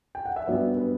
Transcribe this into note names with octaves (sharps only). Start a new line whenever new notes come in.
G5
F#5
E5
G2 F#3 B3 D4 B4 D5
B4